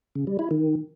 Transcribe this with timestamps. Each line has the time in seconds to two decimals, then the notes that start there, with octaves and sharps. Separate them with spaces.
0.15 C#3
0.27 G3
0.39 E4
0.51 D#3